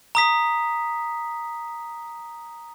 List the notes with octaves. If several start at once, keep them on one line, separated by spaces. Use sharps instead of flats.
A#5 D#6 B6